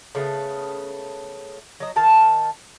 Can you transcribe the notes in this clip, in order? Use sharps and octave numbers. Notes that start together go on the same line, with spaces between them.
C#3 A3 B3
F#3 D#5
D#3 F5 A5